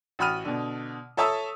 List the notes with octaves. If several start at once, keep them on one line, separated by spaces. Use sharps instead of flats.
A1 F#4 B5 D#6 F6 D#7
B2 D3
A4 C#5 E5 A5 D#6 E6